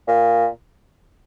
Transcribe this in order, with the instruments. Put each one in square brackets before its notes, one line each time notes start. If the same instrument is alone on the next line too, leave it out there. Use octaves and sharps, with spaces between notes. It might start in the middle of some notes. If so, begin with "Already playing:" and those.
[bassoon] A#2